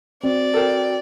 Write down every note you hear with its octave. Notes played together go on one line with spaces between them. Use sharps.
C4 F#4 D5
F#4 A4 A#4 C5 G5